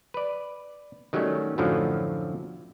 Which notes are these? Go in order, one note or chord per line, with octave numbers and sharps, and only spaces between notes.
B4 D5
D#3 F#3 G3 A3 C#4
F#2 A2 D3 F3 F#3